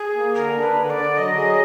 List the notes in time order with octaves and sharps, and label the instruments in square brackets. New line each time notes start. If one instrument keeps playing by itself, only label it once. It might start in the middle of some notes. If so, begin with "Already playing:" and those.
Already playing: [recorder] G#4
[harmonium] A#3
[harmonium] D3 [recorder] A#4
[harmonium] D4
[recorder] B4
[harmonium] D3
[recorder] D5
[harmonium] D3
[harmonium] F#3 [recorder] D#5
[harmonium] G#4